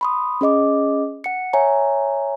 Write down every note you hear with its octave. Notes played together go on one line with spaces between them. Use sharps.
B5 C6 D#6
C#4 G#4 D#5 D6
F#5 C#7
C#5 E5 G#5 A#5